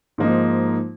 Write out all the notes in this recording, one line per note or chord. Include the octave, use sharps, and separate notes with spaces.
G#2 F3 A#3 D#4